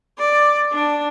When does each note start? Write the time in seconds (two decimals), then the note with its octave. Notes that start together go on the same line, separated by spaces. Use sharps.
0.18 D5
0.72 D4